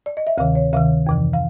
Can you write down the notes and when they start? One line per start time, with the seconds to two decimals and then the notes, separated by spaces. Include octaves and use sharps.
0.06 D5
0.17 D#5
0.27 E5
0.38 D2 C3 D#3 F5
0.55 C#5
0.72 D2 C3 D#3 F5
1.07 F2 C3 E3
1.33 F5